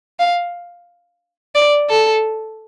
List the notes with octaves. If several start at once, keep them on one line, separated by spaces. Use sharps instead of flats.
F5
D5
A4